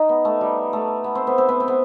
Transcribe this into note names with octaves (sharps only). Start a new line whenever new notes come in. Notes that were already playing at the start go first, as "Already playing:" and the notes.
Already playing: D#4
B3
A3
G3
A3
B3
C4
B3
C4
B3
C4
B3